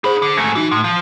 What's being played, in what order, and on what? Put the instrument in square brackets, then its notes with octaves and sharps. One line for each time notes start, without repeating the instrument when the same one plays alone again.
[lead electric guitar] D#4 B5 [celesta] G#4 C5
[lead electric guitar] D3
[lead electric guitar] G#2 A3 [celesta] G#6 A#6 C#7
[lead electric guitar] E3 [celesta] D#4 F#4
[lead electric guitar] A2 [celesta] C6
[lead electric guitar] F3